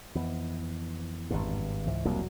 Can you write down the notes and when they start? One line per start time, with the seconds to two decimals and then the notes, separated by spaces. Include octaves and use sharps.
0.15 F2 E3 B3
1.31 G#1 G2
1.87 C#2 G#2 E3
2.05 E1 C2 F#3 A#3